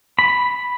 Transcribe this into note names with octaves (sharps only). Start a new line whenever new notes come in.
B5